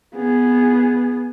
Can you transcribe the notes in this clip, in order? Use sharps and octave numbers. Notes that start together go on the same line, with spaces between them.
B3 G#4